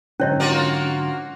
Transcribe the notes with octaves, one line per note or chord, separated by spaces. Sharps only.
G#2 D3 F#3 C#4 C#5 D#5
A#3 F4 F#4